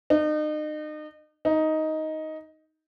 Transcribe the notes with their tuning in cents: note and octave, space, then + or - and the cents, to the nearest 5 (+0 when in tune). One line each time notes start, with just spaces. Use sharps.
D#4 -35
D#4 +10